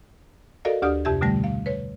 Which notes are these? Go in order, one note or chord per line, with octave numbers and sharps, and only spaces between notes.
F#4 A4 A#4 D5 D#5 F5
D2 D4 G4 D5 D#6 F6
F2 C3 G4 E5 G#6
B2 D3 G3 A3 A#6
F5
B4 C#5